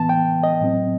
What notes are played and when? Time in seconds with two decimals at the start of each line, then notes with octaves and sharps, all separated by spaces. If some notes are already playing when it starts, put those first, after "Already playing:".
Already playing: A2 E3 B3 A5
0.09 G5
0.43 D#5
0.61 A2 F#3 C4